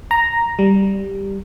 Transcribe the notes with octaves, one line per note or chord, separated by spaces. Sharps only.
A#5
G3